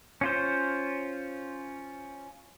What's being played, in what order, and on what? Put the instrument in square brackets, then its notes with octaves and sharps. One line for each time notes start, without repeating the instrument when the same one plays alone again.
[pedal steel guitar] C#4 F4 C5